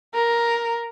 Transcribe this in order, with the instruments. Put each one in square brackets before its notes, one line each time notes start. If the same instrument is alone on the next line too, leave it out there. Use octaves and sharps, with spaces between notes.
[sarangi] A#4